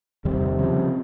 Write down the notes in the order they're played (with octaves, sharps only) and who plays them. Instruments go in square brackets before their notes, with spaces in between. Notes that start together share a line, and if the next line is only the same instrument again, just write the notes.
[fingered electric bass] E2 D#3 G3 [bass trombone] C3
[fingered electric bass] C#3 F3